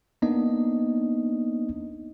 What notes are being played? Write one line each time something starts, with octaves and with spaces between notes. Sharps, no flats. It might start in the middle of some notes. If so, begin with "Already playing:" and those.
A#3 B3 D4 D#4 D#5